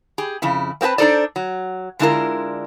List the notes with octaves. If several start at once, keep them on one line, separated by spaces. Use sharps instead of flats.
G4 G#4
F2 C#3 E4
A#3 C4 F#4 B4 A5
D4 D#4 A4 C5 D5
F#3
D3 G#3 D4 E4 F4 A#4